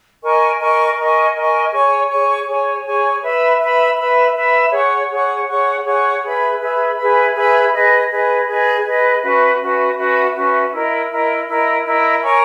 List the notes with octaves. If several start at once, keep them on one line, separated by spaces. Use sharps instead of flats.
A#4 D#5 G#5 C#6
A#4 D#5 G#5 C#6
A#4 D#5 G#5 C#6
A#4 D#5 G#5 C#6
G#4 C#5 G#5 C#6
G#4 C#5 G#5 C#6
G#4 C#5 G#5 C#6
G#4 C#5 G#5 C#6
B4 E5 B5
B4 E5 B5
B4 E5 B5
B4 E5 B5
G#4 C#5 F#5 C#6
G#4 C#5 F#5 C#6
G#4 C#5 F#5 C#6
G#4 C#5 F#5 C#6
G#4 B4 E5 B5
G#4 B4 E5 B5
G#4 B4 E5 B5
G#4 B4 E5 B5
G#4 B4 D#5
G#4 B4 D#5
G#4 B4 D#5
G#4 B4 D#5
C#4 F#4 B4 E5
C#4 F#4 B4 E5
C#4 F#4 B4 E5
C#4 F#4 B4 E5
E4 A#4 D#5
E4 A#4 D#5
E4 A#4 D#5
E4 A#4 D#5
A#4 C#5 G#5 C#6